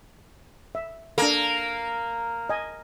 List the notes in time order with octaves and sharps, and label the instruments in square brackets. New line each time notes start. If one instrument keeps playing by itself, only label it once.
[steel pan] E5
[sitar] A#3 [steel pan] D4 A4
[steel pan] D#5 G#5